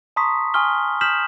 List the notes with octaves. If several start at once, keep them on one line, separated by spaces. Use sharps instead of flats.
A5 A#5 C6 C#6 D#6 B6
G#5 C6 C#6 D#6 F6 G7
D#6 F6 G6 B6 E7 F#7